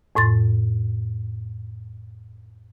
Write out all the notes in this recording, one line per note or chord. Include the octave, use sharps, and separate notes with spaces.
F2 A2 C6 A6